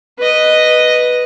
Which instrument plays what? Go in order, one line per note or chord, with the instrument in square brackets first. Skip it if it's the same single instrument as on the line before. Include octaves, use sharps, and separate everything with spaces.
[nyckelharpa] B4 D#5